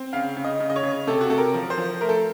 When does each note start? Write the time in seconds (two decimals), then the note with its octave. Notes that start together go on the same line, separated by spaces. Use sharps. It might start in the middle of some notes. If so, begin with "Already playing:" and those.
Already playing: C4
0.13 C#3 F5
0.37 C#3
0.44 D#5
0.60 C#3
0.70 D#5
0.76 C#5
0.83 C#3
1.07 C3 A4
1.21 F#4
1.30 C3 A4
1.38 A#4
1.54 F3
1.70 C5
1.78 F3
2.01 A3 A#4
2.09 A4